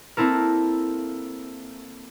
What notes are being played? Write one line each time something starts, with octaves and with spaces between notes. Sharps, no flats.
A#3 C4 E4 A4 A#4